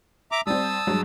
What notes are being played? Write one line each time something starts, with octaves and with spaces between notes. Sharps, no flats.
E5 A#5 D6
G3 C4 A5 D#6 E6
G2 F#3 G#3